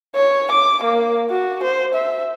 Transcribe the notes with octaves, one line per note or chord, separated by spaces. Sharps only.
C#5
D6
A#3
F#4
C5
E5